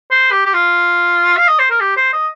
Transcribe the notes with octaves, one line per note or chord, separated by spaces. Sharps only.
C5
G4
G4
F4
F5
D#5
C5
A#4
G4
C5
D#5